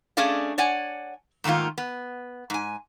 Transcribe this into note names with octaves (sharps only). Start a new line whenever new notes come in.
A3 C#4 D4 G#4 D5 F5
C#5 D5 F#5 G#5
G#2 D#3 A3 A#3 F4
B3
G#2 G#5